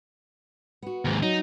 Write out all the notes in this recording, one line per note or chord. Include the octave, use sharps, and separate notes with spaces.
B3 F#4
D#2 G#2
F#3 D#4